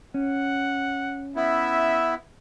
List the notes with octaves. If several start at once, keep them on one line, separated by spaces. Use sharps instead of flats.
C#4 F#5
B3 E4 E5